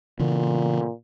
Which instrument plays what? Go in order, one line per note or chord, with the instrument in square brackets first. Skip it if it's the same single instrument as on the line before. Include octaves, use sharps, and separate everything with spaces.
[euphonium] A#2 [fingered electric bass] C#3 E3